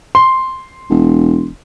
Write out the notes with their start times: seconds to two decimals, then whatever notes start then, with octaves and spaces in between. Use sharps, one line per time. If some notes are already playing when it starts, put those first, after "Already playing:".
0.15 C6
0.90 E1